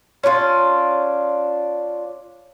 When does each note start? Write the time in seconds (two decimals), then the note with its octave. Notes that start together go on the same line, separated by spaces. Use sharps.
0.23 C#4 D4 E4 F4